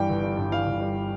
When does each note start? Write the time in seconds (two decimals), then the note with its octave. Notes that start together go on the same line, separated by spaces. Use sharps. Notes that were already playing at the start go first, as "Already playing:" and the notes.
Already playing: G2 E3 G3 G5
0.09 G1
0.23 G3
0.37 G2
0.52 E3 F5
0.67 G1
0.81 G3